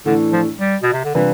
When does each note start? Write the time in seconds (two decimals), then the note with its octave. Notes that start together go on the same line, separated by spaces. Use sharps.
0.06 A2 D3 E3 A3 D4
0.32 F3
0.60 G3
0.82 B2
0.93 C3
1.05 D3
1.15 C3 E3 G3 D4 F4 B4